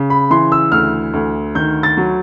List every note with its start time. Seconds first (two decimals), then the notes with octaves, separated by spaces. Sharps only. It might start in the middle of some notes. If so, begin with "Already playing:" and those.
Already playing: C#3
0.10 B5
0.30 E3 C6
0.52 E6
0.72 D2 F6
1.14 D2
1.55 D#3 G6
1.83 A6
1.97 F#3